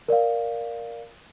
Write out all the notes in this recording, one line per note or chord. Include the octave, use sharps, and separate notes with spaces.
A#4 D5 F5